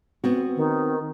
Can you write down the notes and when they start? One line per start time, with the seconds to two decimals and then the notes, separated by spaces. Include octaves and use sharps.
0.24 B3 C4 F#4
0.56 D#3